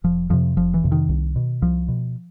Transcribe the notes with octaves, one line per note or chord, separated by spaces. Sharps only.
F1 F3
F2 C3 F3
F1 F3
E3
F2 C3
D#3
C2
B2
C2 F3
B2